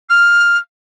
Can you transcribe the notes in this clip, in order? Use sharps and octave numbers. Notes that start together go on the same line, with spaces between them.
F6